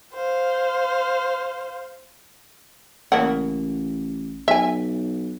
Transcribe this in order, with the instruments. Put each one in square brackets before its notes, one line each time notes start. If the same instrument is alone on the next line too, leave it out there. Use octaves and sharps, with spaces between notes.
[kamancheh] C5 F5
[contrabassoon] A1 [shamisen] C#3 A#3 F#5
[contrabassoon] B1 [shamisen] E5 G#5